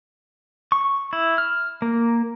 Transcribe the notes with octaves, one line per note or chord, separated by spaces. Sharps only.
C#6
E4
F6
A#3